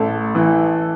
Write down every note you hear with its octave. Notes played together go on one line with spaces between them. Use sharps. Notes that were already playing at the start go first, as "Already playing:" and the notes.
Already playing: A1 A4
E3